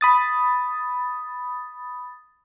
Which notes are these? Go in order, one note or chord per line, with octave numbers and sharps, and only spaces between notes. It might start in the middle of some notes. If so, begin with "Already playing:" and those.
B5 D#6 A6